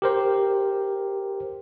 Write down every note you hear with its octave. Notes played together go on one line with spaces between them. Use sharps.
G4 A#4 C5